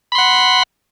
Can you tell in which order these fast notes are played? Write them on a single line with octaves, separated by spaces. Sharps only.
B5 C6 F#5